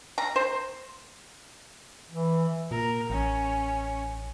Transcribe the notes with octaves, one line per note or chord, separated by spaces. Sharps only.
A#5
C5
E3
A#2 A#4
A1 C#4